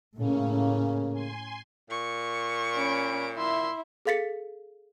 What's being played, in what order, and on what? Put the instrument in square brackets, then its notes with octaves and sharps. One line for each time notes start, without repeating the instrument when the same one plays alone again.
[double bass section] A2 [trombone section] C#3 A#3 [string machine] C#4
[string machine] G#5 C6
[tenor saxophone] A#2 [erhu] C#6
[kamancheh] C#4 B5 [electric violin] D7
[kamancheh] E4 [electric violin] E5 C6
[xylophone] G#4 A4 F5 A6 B6 C#7